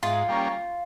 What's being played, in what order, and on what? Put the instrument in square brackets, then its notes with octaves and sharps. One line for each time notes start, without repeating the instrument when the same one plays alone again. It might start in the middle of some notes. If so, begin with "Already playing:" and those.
[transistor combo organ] G#2 [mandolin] F4
[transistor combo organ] G3 A#3 C#4